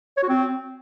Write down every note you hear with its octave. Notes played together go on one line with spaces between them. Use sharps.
C#5
F#4
C4